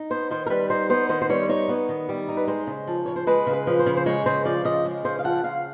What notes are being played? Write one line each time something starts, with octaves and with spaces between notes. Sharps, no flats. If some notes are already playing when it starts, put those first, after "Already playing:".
Already playing: D#4
B3 C5
D#3 C5
A#4
G3 B4
D#4 C5
B3 C5
D#3 C5
C5
G3 C#5
D#4 C#5
B3
D#3
G3
D#4
B4
G#3 C5
C#3
F3
C#3 C#5
C5
G#3 B4
C#3
B4
F3
C5
C#3
C5
G#3 C#5
C#3 C5
F3 D5
C#3 D#5
G#3
C#3 C5
F5
F3 F#5
C#3 F5